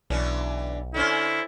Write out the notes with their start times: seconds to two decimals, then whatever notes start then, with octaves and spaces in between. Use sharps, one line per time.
0.10 B1 E3 C#4 D4
0.94 D3 C#4 E4 C5